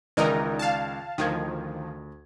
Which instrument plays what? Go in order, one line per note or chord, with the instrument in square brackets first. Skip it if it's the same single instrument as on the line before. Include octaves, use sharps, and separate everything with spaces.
[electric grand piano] C#2 D#3 D5 [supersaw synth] E3 D#4 A#4
[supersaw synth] F5 A5
[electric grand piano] D2 G#6 [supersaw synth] D#3 F3